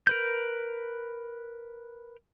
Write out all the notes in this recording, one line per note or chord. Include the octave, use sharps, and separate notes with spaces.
A#4 B4 G6